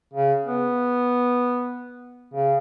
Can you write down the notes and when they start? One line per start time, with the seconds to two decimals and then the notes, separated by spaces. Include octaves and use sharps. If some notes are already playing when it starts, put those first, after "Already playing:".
0.13 C#3
0.46 B3
2.34 C#3